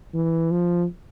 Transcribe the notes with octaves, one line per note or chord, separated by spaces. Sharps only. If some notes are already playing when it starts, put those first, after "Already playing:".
E3
F3